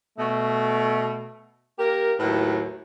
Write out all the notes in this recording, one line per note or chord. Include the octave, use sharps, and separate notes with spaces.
B2 A3
A#3 G4 A#4
D#2 A2 F#3 B4